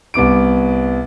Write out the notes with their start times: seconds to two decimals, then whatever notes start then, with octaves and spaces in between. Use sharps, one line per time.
0.14 C2 B3 D6 D7